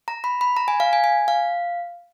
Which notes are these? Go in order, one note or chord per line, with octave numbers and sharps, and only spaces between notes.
A#5
B5
B5
A#5
G#5
F5
G#5
G#5
F5